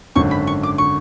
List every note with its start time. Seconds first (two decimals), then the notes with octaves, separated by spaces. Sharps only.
0.16 G#1 F#2 D3 C#6
0.31 B5
0.47 C#6
0.63 D6
0.78 D3 C#6